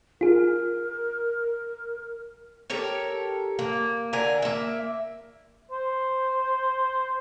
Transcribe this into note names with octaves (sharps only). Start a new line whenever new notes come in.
F4 G#4 A#4
G4 A4 A#4 C#5
A#3
D3 A#4 G#5
A#3 E5
C5